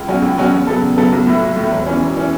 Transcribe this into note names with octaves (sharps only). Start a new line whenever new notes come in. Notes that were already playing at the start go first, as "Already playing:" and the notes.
Already playing: C#2
B2 F#3 C#4 F#4
C#2
B2 F#3 C#4 F#4
E2
C#3 F#3 B3 A4
E2
C#3 F#3 B3 A4
B1
A2 A3
B1
A2 A3
E1
E2 E3 C#4
E1
E3 C#4